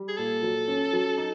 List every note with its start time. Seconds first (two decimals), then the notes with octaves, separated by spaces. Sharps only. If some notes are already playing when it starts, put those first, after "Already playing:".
Already playing: G3
0.08 G#4
0.17 A#2 A4
0.43 F#3
0.68 C#4
0.93 F#3
1.18 D#4